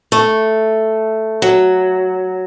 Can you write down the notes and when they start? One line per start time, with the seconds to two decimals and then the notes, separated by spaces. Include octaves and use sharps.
0.12 A3
1.42 F#3